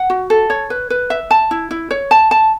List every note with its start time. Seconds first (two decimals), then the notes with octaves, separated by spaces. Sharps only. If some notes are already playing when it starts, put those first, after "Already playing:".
Already playing: F#5
0.10 F#4
0.30 A4
0.50 C#5
0.70 B4
0.90 B4
1.10 E5
1.31 A5
1.51 E4
1.71 E4
1.91 C#5
2.11 A5
2.31 A5